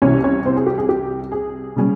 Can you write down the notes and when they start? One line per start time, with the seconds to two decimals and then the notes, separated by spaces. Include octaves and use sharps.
0.02 C2 C3 E3 C#4 C#5
0.23 C#4 C#5
0.45 C4 C5
0.56 G#4
0.66 G4
0.78 G#4
0.89 G4
1.32 G#4
1.76 C#3 G3 C#4